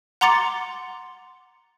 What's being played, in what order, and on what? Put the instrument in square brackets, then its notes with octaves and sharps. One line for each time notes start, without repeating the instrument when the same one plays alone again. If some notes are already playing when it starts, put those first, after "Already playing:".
[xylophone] F#5 A#5 C6 D6 A6 C#7